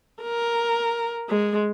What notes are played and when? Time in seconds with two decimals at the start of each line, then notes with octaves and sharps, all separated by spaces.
0.23 A#4
1.30 G#3